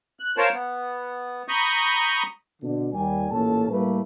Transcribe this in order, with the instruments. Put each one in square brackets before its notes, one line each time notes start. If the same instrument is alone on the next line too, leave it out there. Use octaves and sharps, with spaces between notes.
[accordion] F#6
F4 A#4 C5 C#5 A5
B3
A#5 B5 C#6 D#6 G6
[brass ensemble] B2 D3 D4
D#2 G3 G#5
A1 A#2 C#4 A4 A5
A2 G3 A3 A#3 B4